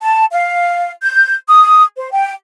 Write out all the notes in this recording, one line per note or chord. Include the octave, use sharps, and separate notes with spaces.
A5
F5
G6
D#6
C5
G5